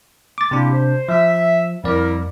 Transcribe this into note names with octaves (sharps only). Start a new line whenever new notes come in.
D6 A6
C3 A#3 D4 E4 G4
C5
F3 E5
F2 G3 E4 A#4 D5